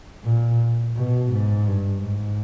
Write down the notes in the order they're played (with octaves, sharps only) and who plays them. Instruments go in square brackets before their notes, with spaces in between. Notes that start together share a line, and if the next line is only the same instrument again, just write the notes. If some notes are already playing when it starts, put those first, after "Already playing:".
[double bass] A#2
B2
G#2
G2
G#2